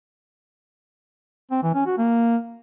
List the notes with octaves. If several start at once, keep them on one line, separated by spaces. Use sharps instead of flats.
C4
E3
C#4
F#4
A#3